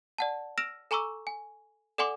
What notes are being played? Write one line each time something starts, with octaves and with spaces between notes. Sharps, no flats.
D5 F#5 A5
E6 F6 A#6 D7 E7 F7
A4 G#5 A#5 C#6 D6 E6
G#5
A4 D5 F#5 G#5 C6 D6